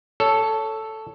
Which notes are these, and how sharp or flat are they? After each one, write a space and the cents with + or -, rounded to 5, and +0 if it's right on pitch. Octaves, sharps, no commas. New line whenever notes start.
A4 +0 C#5 +15